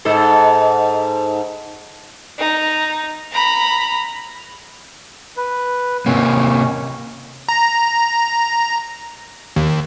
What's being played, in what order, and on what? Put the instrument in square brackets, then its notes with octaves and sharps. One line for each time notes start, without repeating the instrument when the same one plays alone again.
[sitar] G#2 D#4 A4
[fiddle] D#4
A#5 B5
[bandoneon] B4
[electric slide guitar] C3 A#3 [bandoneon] C#4
[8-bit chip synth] A#5
D#2